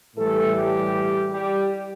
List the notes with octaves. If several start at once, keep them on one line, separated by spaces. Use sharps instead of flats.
A2 E3 G3 A3 A4
G3 G4
G3 G4